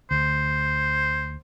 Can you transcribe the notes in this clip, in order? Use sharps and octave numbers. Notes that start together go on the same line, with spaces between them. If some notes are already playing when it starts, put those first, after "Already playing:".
D2 C5